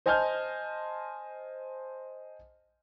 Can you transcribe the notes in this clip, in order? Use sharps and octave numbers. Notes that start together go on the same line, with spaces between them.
C5 D#5 G#5 A5 F6 G6